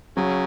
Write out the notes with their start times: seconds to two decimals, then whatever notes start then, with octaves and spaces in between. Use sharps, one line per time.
0.17 C#3 F#3